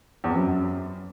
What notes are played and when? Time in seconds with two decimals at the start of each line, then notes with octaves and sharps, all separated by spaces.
0.24 E2
0.30 F2
0.36 F#2